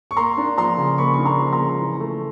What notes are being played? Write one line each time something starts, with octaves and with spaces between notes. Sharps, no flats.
C#6
A#3 A#5 C6
D4
F3 A#5 C6
C#3
A#3 B5 C#6
C#6
D4
A#5 C6
F3
A#5 C6
C#3
E3
A3